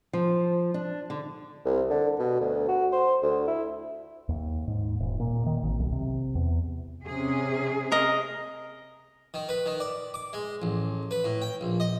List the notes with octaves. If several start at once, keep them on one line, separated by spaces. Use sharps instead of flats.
F3
D4
D3
C2
D3
B2
D2
F#4
C5
D2
E4
D#2
G#2
D#1
A#2
D#3
G#1
B1
C3
E2
C3 C#4 G#4
A#4 D#5
D#3
B4
D#3
D5
D6
G#3
A1
B4
A2
G5
A#1
D#5